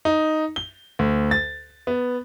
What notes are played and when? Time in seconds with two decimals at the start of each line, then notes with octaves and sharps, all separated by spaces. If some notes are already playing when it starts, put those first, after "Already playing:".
0.05 D#4
0.56 G7
0.99 D2
1.31 A6
1.87 B3